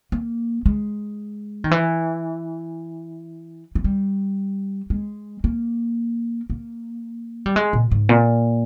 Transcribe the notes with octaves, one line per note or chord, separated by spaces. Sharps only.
A#3
G#3
D#3
E3
E3
G3
G#3
A#3
A#3
G3
G#3
A#2
G#2
A#2